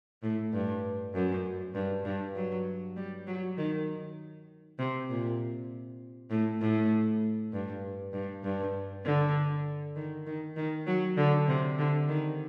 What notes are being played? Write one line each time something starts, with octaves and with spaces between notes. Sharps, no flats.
A2
G2
F#2
G2
G2
F#3
G3
F#3
D#3
C3
A#2
A2
A2
G2
G2
G2
D3
D#3
D#3
D#3
F#3
D3
C3
D3
D#3